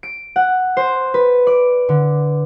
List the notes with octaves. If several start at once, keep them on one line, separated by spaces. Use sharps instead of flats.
D7
F#5
C5
B4
D5
D3